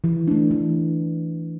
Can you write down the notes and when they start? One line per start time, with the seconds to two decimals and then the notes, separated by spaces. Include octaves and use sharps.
0.04 E3
0.28 A3 D4
0.51 E3